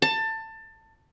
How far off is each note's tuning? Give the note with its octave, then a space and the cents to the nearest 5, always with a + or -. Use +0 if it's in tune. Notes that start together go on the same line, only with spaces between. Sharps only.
A5 +20